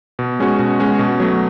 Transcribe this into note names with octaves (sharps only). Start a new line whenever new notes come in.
B2
G#3 C#4 F#4
B2
G#3 C#4 F#4
B2
F#3 A3